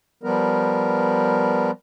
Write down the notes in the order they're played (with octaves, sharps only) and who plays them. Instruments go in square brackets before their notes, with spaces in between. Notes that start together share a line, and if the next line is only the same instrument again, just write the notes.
[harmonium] F3 G3 B3 A#4